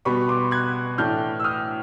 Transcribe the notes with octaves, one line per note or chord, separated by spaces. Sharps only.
B2 G3 B3 B5 C#6
C6 D6
F#6 G#6
A2 E3 A3 D4 F6 G6
E6
D#6 F6